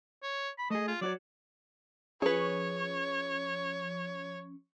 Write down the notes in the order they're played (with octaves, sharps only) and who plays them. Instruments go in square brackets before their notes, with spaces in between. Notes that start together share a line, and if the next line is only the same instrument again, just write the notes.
[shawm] C#5
B5
[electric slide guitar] A3 G#4 [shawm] D#5
[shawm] F4
[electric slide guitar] F#3 F#4 C#5 [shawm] D5
[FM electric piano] F3 C#4 C#6 [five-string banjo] G#4 B4 [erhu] C#5